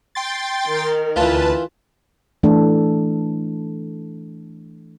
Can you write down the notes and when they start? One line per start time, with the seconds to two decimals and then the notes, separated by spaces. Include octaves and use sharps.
0.15 G5 C6 A6
0.67 D#3 A#4
1.16 D2 E3 F4 B4 A5
2.43 E3 A3 D4 A4